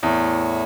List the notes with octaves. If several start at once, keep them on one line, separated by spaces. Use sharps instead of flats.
E2 A2